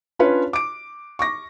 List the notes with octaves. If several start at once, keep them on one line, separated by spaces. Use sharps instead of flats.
C#4 D4 F4 B4 C#5
D6 D7
C#6 D6 A#6